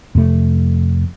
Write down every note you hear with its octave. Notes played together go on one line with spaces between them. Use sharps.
F2 C3 A3